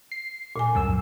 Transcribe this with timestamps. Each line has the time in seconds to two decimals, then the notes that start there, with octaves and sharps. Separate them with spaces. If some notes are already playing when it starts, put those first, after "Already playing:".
0.12 C7
0.56 A#2 G#5
0.75 C#2 F#2 E6